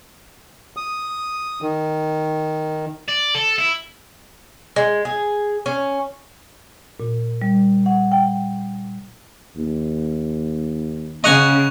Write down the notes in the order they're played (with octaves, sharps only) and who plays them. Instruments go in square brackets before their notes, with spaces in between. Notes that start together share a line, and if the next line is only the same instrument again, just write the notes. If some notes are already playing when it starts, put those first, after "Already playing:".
[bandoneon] D#6
D#3
[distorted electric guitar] D5
A4
E4
[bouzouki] G#3
G#4
C#4
[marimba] A#2
G3
F#5
G5
[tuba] D#2
[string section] C#3 [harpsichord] D#5 F#5 G#5 [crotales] C#6 F7